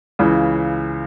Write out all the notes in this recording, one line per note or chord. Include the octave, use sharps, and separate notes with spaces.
C#2 C#3 E3